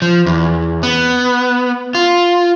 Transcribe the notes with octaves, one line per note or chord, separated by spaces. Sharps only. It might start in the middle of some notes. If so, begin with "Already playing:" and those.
F3
E2
B3
F4